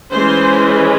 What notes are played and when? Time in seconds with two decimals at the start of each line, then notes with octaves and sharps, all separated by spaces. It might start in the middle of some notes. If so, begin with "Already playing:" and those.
0.11 E3 G#3 C#4 C5